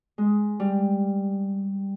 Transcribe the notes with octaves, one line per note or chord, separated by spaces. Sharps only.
G#3
G3